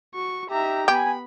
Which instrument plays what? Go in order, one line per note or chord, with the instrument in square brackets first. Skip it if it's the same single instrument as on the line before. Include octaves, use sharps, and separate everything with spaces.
[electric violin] F#4 C#6
[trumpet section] D#4 G4 [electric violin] E5 A#5
[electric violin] B3 B5 [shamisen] G4 [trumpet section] G#5